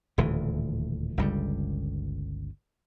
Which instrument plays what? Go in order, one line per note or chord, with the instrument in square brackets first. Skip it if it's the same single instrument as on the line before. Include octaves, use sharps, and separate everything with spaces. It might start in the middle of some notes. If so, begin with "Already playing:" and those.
[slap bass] D#1 D2 A2 E3
G1 C#2 G3